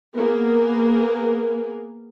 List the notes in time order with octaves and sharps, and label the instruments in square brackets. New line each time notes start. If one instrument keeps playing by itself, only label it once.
[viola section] A#3 B3 G#4 A#4